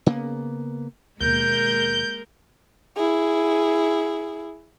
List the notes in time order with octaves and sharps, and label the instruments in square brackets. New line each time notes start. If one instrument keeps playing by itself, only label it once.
[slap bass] C#3 A#3 B3
[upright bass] D#2 B2 [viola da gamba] G#3 A#3 A#4 [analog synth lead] G6
[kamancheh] E4 G#4